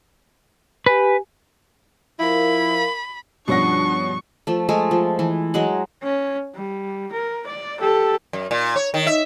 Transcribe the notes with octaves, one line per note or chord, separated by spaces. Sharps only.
G4 B4 G#5
F3 E4 A#4 F5 B5
G2 B2 F3 C#4 D4 F#5 C#6 A#6
F3 A3
G#3 A3 G#4
F3
E3
F#3 G#3 F#5
C#4
G3
A#4
D5
G4 A4
F#2
A#2
C#5
D#3
E5